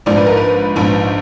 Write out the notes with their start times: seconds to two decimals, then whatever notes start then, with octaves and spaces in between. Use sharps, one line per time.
0.06 A#1 G#2 F3 D5
0.17 B4
0.26 A#4
0.37 B4
0.76 A#1 G#2 F3